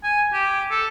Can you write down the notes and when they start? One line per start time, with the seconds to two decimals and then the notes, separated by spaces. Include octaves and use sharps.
0.03 G#5
0.33 G4
0.71 A4